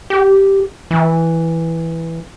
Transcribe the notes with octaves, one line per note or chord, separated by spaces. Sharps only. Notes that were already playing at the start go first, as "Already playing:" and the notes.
G4
E3